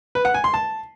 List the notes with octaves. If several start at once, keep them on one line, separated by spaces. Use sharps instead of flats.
B4
F#5
G#5
C6
A5